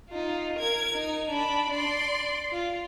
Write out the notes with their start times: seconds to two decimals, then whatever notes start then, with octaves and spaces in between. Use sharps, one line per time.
0.10 D#4 F4
0.59 A#4 G#6
0.95 D#4
1.30 D4 B5
1.71 D5 C6
2.53 F4